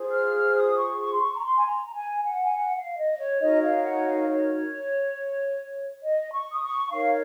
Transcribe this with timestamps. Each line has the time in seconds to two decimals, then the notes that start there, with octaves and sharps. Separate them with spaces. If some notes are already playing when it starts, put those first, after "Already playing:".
Already playing: F4 G#4 C5
0.12 F6
0.34 F6
0.55 D#6
0.77 C#6
0.99 C#6
1.12 C6
1.21 C#6
1.36 A#5
1.43 C6
1.56 G#5
1.65 A#5
1.85 A#5
1.94 G#5
2.23 F#5
2.43 G#5
2.53 F#5
2.75 F5
2.97 D#5
3.18 C#5
3.40 D#4 F#4 A#4 C#5 D#5
3.63 F5
3.84 F#5
4.06 F5
4.28 C#5
6.04 D#5
6.32 C#6
6.52 D#6
6.62 C#6
6.91 D#4 A#4 C#5 F5